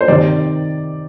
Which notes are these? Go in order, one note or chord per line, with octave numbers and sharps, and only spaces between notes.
C5
C3 D#3 D5